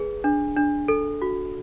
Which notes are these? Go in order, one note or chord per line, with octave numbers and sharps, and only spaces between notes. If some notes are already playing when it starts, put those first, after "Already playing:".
Already playing: G#4 B4
D4
D4
A4
F#4